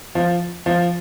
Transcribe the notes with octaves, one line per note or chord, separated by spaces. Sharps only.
F3
F3